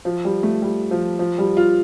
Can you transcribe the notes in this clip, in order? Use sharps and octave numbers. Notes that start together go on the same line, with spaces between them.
F3
G3
A3
G3
F3
F3
G3
F4